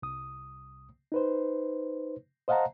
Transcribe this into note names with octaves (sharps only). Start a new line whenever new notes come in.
C2 D#6
D#4 B4 C5
C5 D#5 F5 F#5 A5 A#5